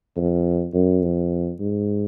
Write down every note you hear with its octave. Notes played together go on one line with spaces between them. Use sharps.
F2
F#2
F2
G#2